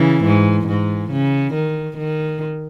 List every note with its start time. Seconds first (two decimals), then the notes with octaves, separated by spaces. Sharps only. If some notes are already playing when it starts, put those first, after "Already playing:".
Already playing: C#3 E3
0.25 G#2
0.68 G#2
1.11 C#3
1.54 D#3
1.98 D#3